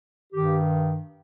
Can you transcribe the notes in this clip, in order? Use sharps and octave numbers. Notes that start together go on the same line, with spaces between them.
G2 D#3 G4